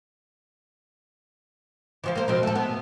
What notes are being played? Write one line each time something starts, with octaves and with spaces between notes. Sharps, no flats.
E3 F3 F4
A#3 C5
B2 F3 C4
A3 A4
B3